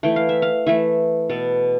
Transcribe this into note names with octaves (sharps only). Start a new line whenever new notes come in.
E3 A3 G5
F5
E5
F5
E3 A3 E5
B2 B3 A4